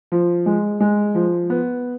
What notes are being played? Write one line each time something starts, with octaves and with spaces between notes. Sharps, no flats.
F3
G#3
G#3
F3
B3